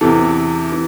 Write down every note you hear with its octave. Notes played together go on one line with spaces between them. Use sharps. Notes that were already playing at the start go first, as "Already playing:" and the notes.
E2 C3 E3 A4
E3